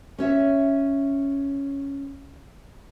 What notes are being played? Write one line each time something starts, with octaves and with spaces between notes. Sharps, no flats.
C#4 C#5 E5